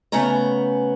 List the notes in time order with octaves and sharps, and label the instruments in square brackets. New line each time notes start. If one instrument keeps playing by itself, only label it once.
[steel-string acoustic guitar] C#3 A3 B3 C#4 A#5